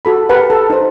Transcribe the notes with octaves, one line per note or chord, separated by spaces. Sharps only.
F#4 A4 B5
G4 A#4 B4 F#5 A5
A4 A5
D#4 C5